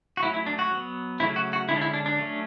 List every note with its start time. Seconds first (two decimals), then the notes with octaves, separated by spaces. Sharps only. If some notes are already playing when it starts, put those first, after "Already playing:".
0.17 F#4
0.22 F#3 A3 C#4 E4
0.34 E4
0.46 D4
0.59 F#4
0.71 F#3 B3
1.20 C#3 F#3 A3 C#4 E4
1.36 F#4
1.53 F#4
1.69 D3 G#3 C#4 E4
1.76 D4
1.81 E4
1.94 D4
2.06 D4
2.18 F#3 A3 C#4